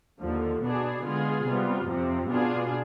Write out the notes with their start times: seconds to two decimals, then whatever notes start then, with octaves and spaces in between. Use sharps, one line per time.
0.21 D#2 D3 F3
0.63 B2 B3 D4 G#4
1.05 D3 G#3 B3 F4 G#4
1.46 C3 G3 B3 F4
1.88 F2 C3 F3 C4
2.30 B2 B3 D4 F4 G#4